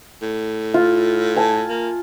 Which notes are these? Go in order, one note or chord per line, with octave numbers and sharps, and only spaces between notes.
A2
F4
G#5 A5
A#3